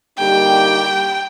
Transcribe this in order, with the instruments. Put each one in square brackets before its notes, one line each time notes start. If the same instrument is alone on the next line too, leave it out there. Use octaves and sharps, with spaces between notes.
[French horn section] D3 G3 A#3 D#4 G4 [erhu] G5